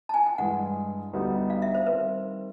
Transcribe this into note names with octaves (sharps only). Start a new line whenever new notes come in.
A5
G#5
G5
G2 E3 G#3 F#5
D2 D3 G3 B3 D#4
F5
E5
C5
D#3 G3 C4 B4